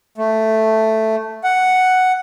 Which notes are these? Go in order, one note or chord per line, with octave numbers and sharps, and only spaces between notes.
A3
F#5